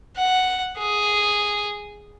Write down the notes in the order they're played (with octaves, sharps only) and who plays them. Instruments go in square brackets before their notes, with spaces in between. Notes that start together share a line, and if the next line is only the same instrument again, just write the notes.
[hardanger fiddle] F#5
G#4